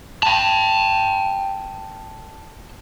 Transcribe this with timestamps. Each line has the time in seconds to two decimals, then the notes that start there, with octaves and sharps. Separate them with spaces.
0.23 G5 A5